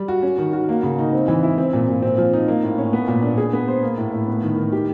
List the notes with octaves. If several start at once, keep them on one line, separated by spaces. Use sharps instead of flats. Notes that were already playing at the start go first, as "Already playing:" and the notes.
Already playing: G3
F#4
C#4
D#3
F#4
A#3
C#3
D#4
C4
E3
E4
C4
A#2
A#2
C4
F3
D#4
A#3
A2
C#4
B3
A#2
D4
G#4
B3
C5
A#3
A2
A2
B3
D#3
D#3
G4